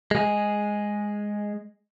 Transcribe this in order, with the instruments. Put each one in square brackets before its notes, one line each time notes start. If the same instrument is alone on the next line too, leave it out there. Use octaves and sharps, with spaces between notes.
[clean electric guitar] G#3 G#4